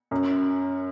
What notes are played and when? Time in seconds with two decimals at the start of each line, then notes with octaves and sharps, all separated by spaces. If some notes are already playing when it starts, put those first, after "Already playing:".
0.11 F#2